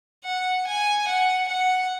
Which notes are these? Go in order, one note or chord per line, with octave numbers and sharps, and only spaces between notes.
F#5
G#5
F#5
F#5